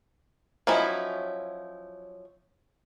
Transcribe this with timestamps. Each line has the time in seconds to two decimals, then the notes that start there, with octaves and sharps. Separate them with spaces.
0.67 F3 F#3 C#4 D#4 E4